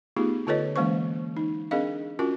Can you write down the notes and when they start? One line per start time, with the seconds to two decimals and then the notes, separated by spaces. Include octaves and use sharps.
0.16 A3 B3 D#4 F4 G4 G#4
0.47 D3 F4 A4 B4 C#5 D#5
0.76 E3 G#3 A#3 C#4 C5 C#6
1.37 D#4
1.71 C4 D4 G#4 A#4 D#5 F5
2.19 C#4 F4 F#4 A#4